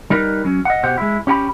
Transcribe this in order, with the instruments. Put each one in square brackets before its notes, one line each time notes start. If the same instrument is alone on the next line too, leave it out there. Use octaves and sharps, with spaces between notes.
[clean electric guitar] G3 D#4 A#4 B4
F#3 C#4
D#5 F#5
B2 G4 C5 F#5
G#3 E4
C#4 G4 G5 B5